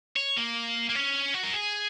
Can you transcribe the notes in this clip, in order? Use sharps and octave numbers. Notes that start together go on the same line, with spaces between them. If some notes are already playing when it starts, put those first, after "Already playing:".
C#5
A#3
A#3
C#4
F#4
A#4
G#4